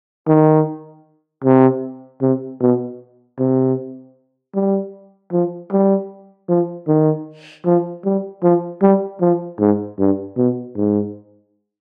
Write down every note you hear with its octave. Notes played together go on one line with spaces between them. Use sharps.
D#3
C3
C3
B2
C3
G3
F3
G3
F3
D#3
F3
G3
F3
G3
F3
G#2
G2
B2
G#2